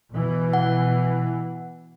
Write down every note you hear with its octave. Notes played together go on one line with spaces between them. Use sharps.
B2 E3
F#5